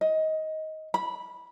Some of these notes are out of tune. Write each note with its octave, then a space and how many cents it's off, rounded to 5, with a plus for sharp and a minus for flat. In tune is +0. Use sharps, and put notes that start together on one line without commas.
D#5 +15
B5 -10